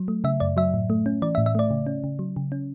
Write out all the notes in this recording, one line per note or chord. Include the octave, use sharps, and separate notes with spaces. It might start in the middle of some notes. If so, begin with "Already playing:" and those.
Already playing: F#3
A3
C#3 E5
F#2 D5
F#3 E5
A2
A3
C#4
E3 D5
E5
A2
E5
A3 D5
C#3
C#4
C#3
F#3
C#3
C#4